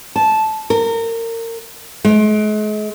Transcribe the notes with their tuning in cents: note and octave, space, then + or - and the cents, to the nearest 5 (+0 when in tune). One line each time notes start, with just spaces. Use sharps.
A5 -10
A#4 -30
G#3 +40